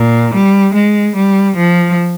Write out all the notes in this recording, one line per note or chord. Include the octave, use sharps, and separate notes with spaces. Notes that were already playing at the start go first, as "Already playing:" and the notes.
Already playing: A#2
G3
G#3
G3
F3